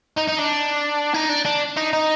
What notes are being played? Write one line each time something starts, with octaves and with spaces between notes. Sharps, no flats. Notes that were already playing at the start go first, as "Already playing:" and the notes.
D#4
D#4
D4
D#4
D4
D4
D#4
D#4